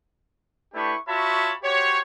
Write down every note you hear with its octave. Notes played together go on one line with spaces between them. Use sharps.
A3 D4 E4 G4 B4 C#6
F4 F#4 C#5 E5 A5 B5
F#4 G4 C5 C#5